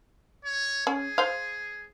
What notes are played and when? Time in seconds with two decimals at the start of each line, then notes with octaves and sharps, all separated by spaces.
0.45 C#5
0.87 C#4 G#4
1.18 C5 F5